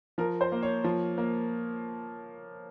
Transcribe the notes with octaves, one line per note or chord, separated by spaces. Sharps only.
F3 A#4
C5
A#3
C#5
F3
A#3